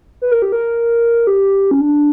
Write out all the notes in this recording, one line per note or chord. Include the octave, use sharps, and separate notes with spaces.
B4
A#4
G4
A#4
G4
C#4
D4